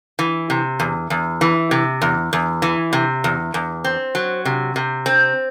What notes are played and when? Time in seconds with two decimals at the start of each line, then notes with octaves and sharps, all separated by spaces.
0.19 E3
0.50 C3
0.80 E2
1.10 E2
1.41 E3
1.71 C3
2.02 E2
2.33 E2
2.62 E3
2.93 C3
3.24 E2
3.54 E2
3.84 C4
4.15 F#3
4.45 C3
4.76 C3
5.06 C4